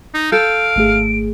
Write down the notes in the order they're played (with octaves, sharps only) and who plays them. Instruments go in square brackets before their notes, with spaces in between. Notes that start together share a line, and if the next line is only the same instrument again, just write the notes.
[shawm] D#4
[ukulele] A4 [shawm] F5 [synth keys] G6 [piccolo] D7
[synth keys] G#1 A3 G#4